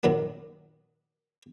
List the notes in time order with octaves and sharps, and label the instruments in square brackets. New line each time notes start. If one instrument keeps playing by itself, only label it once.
[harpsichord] F#2 A#2 D#3 F#3 A#3 D4